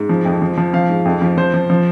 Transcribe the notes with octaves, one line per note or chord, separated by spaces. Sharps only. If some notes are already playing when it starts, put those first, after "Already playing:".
Already playing: G#2
F3
F2
F3
F3
F3 F5
G#2
F2
F3
F3 C5
F3
F3